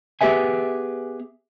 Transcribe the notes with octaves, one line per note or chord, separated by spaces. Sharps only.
B3 G4 G#4 B4 E5 G#5